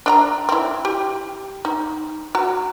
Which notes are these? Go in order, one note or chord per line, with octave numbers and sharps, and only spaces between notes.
D4 D#5 A#5
C4 E4
G4
D#4
F#4 A#5